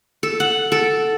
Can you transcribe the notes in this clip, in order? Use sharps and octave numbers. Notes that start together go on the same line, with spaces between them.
A4
F#5
A4